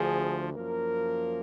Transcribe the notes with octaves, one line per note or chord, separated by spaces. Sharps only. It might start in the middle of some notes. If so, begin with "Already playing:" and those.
Already playing: D2 D3 F3 G#4
F#2 F3 A#3 A#4